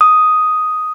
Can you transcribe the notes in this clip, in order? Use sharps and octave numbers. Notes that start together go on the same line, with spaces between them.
D#6